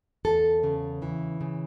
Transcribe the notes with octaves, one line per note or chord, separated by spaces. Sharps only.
E2 A4
C#3
E3
C#3